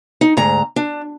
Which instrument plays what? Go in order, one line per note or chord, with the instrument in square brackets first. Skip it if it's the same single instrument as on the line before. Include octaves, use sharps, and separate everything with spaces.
[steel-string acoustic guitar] D#4
D2 G#2 A#5
D4